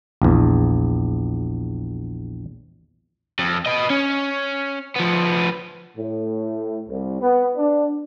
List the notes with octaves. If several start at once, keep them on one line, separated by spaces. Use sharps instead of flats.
A#1 E2
F2
B4 D#5
C#4
F3 B3
A2
C2
B3
D4